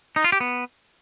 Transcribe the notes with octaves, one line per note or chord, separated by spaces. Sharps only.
D#4
F4
G4
B3